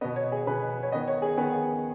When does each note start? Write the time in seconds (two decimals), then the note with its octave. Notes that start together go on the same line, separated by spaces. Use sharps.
0.01 B2 B3 D#5
0.16 C#5
0.32 G#4
0.47 B2 B3 B4
0.83 C#5
0.92 D#3 B3 D#5
1.08 C#5
1.22 G#4
1.37 D#3 B3 G#4